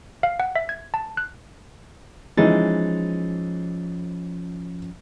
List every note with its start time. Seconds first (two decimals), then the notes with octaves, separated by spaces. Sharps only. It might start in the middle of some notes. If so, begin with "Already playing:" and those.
0.23 F5
0.40 F#5
0.56 E5
0.69 G#6
0.94 A5
1.17 F#6
2.37 E3 F3 G#3 C#4 D#4 A6